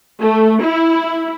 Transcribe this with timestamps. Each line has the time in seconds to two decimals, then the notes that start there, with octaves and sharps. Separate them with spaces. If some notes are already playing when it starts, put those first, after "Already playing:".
0.20 A3
0.64 E4